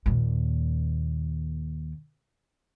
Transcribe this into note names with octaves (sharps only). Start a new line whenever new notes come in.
D#2 A#2